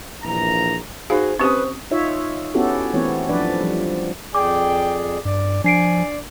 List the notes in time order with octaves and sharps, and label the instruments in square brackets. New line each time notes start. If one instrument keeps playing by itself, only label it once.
[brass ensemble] A#1 E3 A#5
[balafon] D#4 F5 [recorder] F#4 [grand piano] G#4 [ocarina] C5
[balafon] C4 C#4 G4 [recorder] B4 [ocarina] C5 [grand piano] C#6 D#6
[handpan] D#4 F4 C#5 E5
B3 C#4 E4 F#4 G4 A4
E3 A3 B3 C4 C#5
F3 F#3 D4 B4 D5
F3 G3
[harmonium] F2 G#4 D5 [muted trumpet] G5 [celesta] D6
[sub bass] G2 [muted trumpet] D5
[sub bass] F3 [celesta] D4 C7 D7 [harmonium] D5 [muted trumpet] G#5